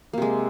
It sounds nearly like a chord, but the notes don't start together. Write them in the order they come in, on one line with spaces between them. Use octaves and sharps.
A#3 C3 G#3